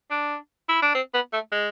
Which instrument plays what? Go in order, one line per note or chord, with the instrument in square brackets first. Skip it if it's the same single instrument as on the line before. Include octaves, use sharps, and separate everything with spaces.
[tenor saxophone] D4
E4
D4
C4
B3
A3
G#3